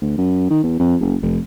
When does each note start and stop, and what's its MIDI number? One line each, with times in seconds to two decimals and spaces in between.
0.01 0.16 38
0.18 0.45 42
0.50 0.59 51
0.63 0.77 40
0.79 0.95 41
1.01 1.15 30
1.22 1.39 29